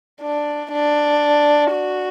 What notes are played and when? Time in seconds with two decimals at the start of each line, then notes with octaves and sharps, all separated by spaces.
0.22 D4
0.72 D4
1.73 F#4